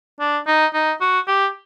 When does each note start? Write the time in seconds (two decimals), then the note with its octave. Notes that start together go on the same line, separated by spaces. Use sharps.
0.20 D4
0.47 D#4
0.74 D#4
1.01 F#4
1.28 G4